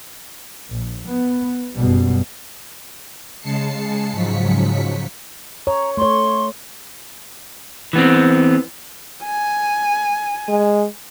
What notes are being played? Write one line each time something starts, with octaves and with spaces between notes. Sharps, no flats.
A#1
B3
F#1 F#2 B2 G3
C#3 G#3 A5 C7 C#7
G#2 C#3 F3 F#3 B6 C#7
C#5 A#5
A3 C#5 C6
E3 B3 C4
G#5
G#3